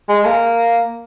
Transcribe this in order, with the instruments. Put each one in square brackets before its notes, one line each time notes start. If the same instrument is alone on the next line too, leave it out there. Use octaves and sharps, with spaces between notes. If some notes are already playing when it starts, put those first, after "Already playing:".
[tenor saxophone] G#3
A#3